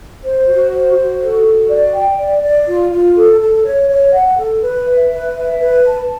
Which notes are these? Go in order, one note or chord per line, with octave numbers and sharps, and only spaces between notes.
C5
F#4
C5
F#4
A4
F#4
D5
G5
D5
D5
F4
F4
A4
A4
C#5
C#5
F#5
A4
B4
E5
B4
E5
B4
A5